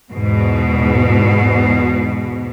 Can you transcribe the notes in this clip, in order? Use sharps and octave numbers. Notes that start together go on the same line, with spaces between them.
E2 G#2 B2